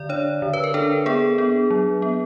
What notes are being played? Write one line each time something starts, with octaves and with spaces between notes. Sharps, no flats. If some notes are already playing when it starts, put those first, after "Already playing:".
Already playing: D3 D5
D4 C#5
D3
B4
A#4
D4 A4
B3 G#4
B3
F#3
B3